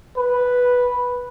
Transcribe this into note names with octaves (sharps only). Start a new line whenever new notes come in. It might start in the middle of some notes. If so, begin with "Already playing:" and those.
B4